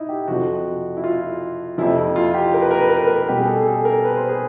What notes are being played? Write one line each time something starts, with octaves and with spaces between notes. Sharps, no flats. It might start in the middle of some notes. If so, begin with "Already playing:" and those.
Already playing: D#4 E4
G4
F2 C3 F3 F#4
E4
F4
F2 C3 F3 E4
E4
F4
G4
A#4
B4
A#4
B4
A#4
B4
A#4
B2 G3 G4
G#4
A4
G#4
A4
A#4
B4
C5
G#4